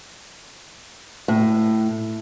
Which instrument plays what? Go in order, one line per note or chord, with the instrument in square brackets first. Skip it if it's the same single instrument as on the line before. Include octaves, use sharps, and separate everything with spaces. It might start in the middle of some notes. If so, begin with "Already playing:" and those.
[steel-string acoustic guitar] A2